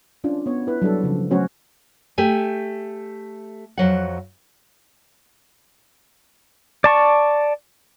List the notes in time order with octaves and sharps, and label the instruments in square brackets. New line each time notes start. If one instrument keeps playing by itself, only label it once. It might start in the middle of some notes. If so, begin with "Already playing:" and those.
[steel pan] C#4 D4 F4
B3 C#5
E4 B4
F#3 G3 D4 A4
C#3 F3
F#3 A3 C#4 F#4 C5 C#5
[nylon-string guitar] A3 G4 G#5
F2 F#3 F#5
[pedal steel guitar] D5 A5 C#6